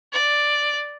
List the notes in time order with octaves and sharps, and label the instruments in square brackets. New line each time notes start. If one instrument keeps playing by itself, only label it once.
[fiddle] D5